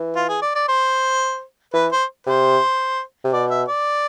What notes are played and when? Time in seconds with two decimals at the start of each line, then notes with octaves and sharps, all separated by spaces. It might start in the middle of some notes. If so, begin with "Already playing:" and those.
Already playing: E3
0.16 F4
0.29 G#4
0.42 D5
0.55 D5
0.68 C5
1.74 E3 B4
1.92 C5
2.27 C3 C5
3.24 C3
3.32 B2 D5
3.50 E5
3.68 D5